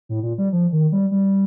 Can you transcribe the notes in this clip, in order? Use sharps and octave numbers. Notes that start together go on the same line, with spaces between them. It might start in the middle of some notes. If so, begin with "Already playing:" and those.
A2
A#2
G3
F3
D#3
G3
G3